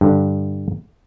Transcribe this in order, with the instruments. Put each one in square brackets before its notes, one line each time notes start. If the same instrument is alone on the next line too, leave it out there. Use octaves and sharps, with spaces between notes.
[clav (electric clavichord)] G2 D3